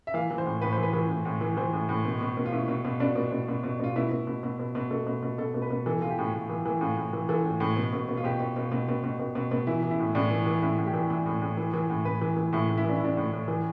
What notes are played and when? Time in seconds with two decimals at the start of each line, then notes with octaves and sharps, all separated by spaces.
0.07 E5
0.14 E3 F5
0.31 E3
0.38 C5
0.46 A2
0.61 A2 B4
0.73 C5
0.78 E3 B4
0.93 E3
1.09 A2
1.25 A2
1.41 E3
1.57 E3 C5
1.73 A2
1.89 A2
2.05 B2
2.21 B2
2.37 B2
2.46 F4
2.53 B2 E4
2.68 B2
2.85 B2
3.00 B2 D4
3.16 B2
3.32 B2
3.48 B2
3.63 B2
3.80 B2 F4
3.96 B2 E4
4.11 B2
4.27 B2
4.43 B2
4.59 B2
4.75 B2
4.91 B2 A4
5.07 B2
5.22 B2
5.38 B2 A4
5.54 B2
5.62 B4
5.70 B2
5.86 E3 A4
6.02 E3 F4
6.10 G4
6.18 A2
6.34 A2
6.49 E3
6.66 E3
6.81 A2 F4
6.97 A2
7.13 E3
7.29 E3 A4
7.45 A2
7.60 A2
7.76 B2
7.93 B2
8.09 B2
8.17 F4
8.24 B2 G4
8.40 B2
8.56 B2
8.72 B2
8.88 B2
9.04 B2
9.19 B2
9.35 B2
9.51 B2
9.67 E3 E4
9.83 E3
9.91 E4
9.99 A2
10.15 A2 D4
10.31 E3
10.46 E3
10.62 A2 E4
10.78 A2
10.86 G4
10.94 E3
11.10 E3
11.26 A2
11.42 A2
11.57 E3
11.74 E3
11.90 A2
12.05 A2 B4
12.22 E3
12.37 E3
12.53 A2 E4
12.69 A2
12.77 E4
12.85 E3 D4
12.96 E4
13.01 E3 D4
13.17 A2
13.32 A2
13.48 E3